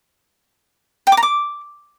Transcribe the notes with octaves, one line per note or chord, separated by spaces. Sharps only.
G5
D6
A#5
D6